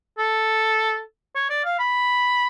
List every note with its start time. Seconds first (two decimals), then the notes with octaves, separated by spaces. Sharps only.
0.18 A4
1.35 C#5
1.50 D5
1.65 F5
1.79 B5